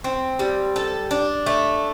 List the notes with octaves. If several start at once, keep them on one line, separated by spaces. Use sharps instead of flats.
C4
G3
A4
D4
A3